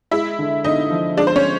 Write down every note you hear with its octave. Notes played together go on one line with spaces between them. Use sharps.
G#3 E4 E5
D3
D3 D#4 D#5
F3
G#3 D4 D5
C5
C#4 C#5